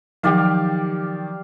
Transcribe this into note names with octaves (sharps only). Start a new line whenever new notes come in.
D#3 F3 F#3 G4 D5 F5